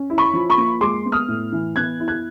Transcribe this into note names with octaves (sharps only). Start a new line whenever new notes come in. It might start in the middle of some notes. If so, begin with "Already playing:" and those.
Already playing: C#4
E4
B5 C#6
F3
B5 C#6
A#3
G#3 C6 D6
B3
D#6 F6
A2
E3
B3 F#6 G#6
E4
F#6 G#6